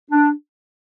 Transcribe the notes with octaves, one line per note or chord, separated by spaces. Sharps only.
D4